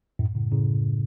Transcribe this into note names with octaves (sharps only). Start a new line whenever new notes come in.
F#2 A2
A2 C#3
A2 C#3